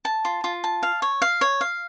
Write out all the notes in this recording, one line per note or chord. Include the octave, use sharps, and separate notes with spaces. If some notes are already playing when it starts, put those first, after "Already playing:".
A5
F4
F4
A5
F5
C#5
F5
C#5
F5